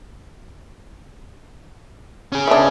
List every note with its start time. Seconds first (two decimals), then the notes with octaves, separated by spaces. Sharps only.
2.32 C#4 G#4
2.48 E3 D4